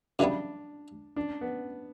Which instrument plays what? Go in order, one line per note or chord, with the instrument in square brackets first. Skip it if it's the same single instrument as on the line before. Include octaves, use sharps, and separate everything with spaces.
[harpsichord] F#2 C#3 E3 G3 B3 [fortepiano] D4
[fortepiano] D4
B3